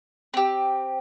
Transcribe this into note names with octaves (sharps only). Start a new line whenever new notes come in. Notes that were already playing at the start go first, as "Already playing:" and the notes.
C4 G4